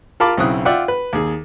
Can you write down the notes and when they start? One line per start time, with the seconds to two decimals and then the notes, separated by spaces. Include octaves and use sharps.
0.20 F4 A#4 F5 A5 B5 D6
0.37 B1 C#3 C4 E4 D#6 F#6
0.65 F4 D5 E5 F#5 G5
0.88 B4
1.13 D#2 G#4